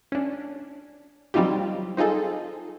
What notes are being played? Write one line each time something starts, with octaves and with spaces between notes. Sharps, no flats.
C#4 D4
F#3 G3 C4 D#4 F4 G4
C4 D#4 F4 G#4 A4